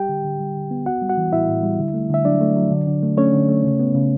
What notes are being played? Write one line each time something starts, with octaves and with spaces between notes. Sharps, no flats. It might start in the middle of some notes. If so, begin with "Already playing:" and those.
Already playing: G3 G4 G5
D3
D3
G3
D3
B3
B3 F#4 F#5
G3
F#4 F#5
E3
A2 E4 E5
A2
G3
D3
A3
D3 E5
F#3 D4 D5
A3
F#3
D3
D3
A3
A3 C#4 C#5
D3
A3
C#3
B3
C#3